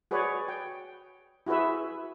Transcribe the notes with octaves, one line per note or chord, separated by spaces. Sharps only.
F#4 G#4 B4 C#5 D5
G5
E4 F#4 G#4 B4 E5